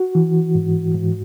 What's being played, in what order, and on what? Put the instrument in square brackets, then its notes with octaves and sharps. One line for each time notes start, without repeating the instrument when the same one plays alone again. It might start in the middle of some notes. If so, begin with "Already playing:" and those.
Already playing: [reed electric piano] F#4
E3
G#2
G#2